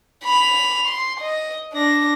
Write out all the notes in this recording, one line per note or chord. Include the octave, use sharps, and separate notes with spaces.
B5 F7
C6
D#5
D4 A#6